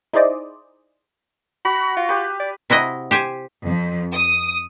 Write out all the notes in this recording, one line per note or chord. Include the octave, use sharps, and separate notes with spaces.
D#4 E4 G#4 C5 D5 D#5
F#4 B5
F4
G4 B4
D5
C3 E4 F#4 D#5
G4 C5 G#5
F2
D#6